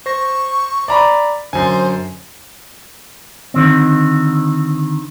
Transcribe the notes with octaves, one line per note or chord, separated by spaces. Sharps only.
C5 C#6 A#6
D5 A#5 B5
F#2 D3 C5 G#5
D3 D#3 C4